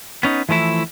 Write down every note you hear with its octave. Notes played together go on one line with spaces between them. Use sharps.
B3 C#4 D#4
E3 F3 A3 E4